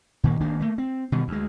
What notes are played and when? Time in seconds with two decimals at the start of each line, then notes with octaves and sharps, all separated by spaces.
0.24 A#2 D#3 A#3
0.40 G#1 D#3 A#3 D4
0.60 A3 A#3
0.78 C4
1.12 B2 D#3 G3
1.28 D2 G#3